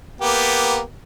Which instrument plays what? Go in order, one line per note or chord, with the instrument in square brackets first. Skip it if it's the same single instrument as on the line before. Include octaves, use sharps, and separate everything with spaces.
[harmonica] A#3 B3 G4